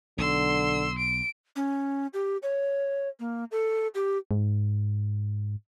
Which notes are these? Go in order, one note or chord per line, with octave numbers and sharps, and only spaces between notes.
B1 D3 C6 E6
D7
C#4
G4
C#5
A#3
A4
G4
G#2